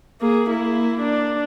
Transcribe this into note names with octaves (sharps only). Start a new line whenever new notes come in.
A#3 G#4
A#3 E4
D4